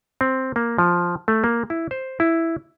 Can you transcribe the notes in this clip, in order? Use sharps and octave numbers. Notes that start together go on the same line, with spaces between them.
C4
A#3
F3
A3
A#3
E4
C5
E4